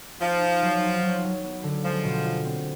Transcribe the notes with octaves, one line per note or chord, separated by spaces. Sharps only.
F3 D#4
D#4
F#3
D#4
F#3
F#3
B3
D3
F3 G#3
B2
F4
C4